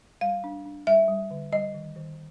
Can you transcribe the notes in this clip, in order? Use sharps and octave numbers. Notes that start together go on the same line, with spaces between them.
G3 F5
D4
D4
G3 E5
G3
D3
G3 D#5
D#3
D#3